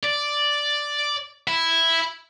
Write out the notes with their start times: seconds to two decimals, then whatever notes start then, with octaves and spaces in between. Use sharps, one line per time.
0.03 D5
1.47 E4